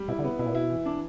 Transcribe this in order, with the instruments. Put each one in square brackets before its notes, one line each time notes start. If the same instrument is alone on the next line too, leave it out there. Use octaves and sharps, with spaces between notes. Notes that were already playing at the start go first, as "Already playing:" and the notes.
Already playing: [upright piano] G3
[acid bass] B2 [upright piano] E4
[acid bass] D3
[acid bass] C#3 [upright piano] B3
[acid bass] B2 [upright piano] E4
[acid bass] A#2
[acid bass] B2 [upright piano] E4
[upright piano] E3
D4